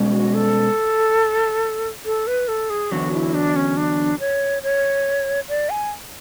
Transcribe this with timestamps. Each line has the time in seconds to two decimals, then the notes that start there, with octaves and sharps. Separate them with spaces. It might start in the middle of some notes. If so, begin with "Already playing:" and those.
Already playing: B2 G#3 C#4
0.13 F#4
0.34 A4
2.05 A4
2.27 B4
2.48 A4
2.70 G#4
2.92 E2 D3 F#3 F#4
3.13 E4
3.34 D4
3.56 C#4
3.77 D4
4.20 C#5
4.63 C#5
5.49 D5
5.70 G#5